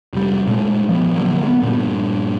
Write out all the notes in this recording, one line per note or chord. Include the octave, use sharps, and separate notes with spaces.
F1 G3
A#2 G#3 A3
F3 A#3 B3
A#1 D3 F#3 A#3
G#3 B3
G2 A#2